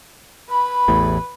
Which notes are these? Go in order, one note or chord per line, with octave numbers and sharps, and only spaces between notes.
B4 B5
A1 E2 A2